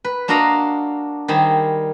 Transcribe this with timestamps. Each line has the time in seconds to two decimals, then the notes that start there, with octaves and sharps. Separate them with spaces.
0.04 B4
0.28 A#3 D4 F#4 A#4 D#5 F5
1.28 D#3 G3 G#4 C5